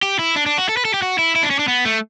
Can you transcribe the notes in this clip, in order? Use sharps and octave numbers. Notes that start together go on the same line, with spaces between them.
G4
E4
D4
D4
F#4
A4
B4
A4
G4
F#4
E4
E4
D4
C#4
D4
B3
A3